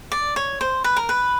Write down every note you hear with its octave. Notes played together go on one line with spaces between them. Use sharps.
D5
C#5
C5
B4
A#4
B4